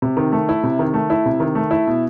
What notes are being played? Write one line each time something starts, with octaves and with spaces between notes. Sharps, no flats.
C3
D#3
A3
E4
C3
D#3
A3
E4
C3
D#3
A3
E4
B2